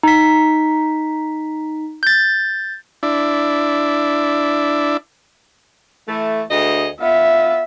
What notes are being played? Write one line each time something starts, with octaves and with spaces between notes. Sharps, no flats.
D#4 B6
G6 A6
D4 E4
E3 A3
D2 G#4 D#5
B3 F4 E5